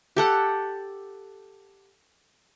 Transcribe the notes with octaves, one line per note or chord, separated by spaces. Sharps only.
G4 A4 F#5